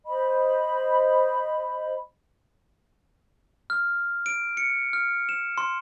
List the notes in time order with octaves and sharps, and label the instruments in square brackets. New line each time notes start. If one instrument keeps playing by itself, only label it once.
[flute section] C5 D#5 B5
[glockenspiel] F6
D7
C#7
F6
E7
C6